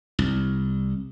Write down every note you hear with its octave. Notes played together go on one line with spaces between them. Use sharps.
C2